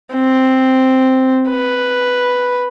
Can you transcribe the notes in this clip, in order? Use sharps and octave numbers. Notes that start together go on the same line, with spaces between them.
C4
B4